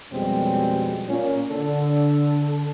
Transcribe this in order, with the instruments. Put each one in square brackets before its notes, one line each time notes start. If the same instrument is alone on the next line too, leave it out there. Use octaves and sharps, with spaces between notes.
[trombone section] F2 B2 G3 G#3 C4 C#4
A#2 C#4
D3 A4